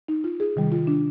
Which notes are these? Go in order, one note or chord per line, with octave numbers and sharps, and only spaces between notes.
D#4
F4
G#4
C3 D#3 G3
F4
D4